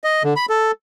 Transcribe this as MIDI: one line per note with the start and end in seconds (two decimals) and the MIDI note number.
0.04 0.23 75
0.24 0.34 50
0.36 0.46 83
0.50 0.72 69